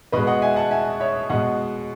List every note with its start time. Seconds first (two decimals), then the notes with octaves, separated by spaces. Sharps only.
0.12 B2 G#3 B4 D#5
0.27 D#5 F#5
0.42 E5 G#5
0.56 F#5 A5
0.71 E5 G#5
1.00 C#5 E5
1.30 B2 G#3 D#5 F#5